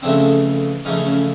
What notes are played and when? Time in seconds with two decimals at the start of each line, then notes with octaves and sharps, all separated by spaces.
0.02 F2 C#3 E3 A3 C4 D4
0.85 F2 C#3 E3 A3 C#4 D#4
1.05 C#4